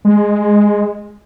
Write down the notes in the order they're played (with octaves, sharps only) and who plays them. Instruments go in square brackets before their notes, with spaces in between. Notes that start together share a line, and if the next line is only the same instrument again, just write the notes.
[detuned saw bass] G#3